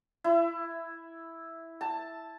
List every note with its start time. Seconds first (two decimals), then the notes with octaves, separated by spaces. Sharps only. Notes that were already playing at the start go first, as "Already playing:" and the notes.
0.24 E4
1.81 A5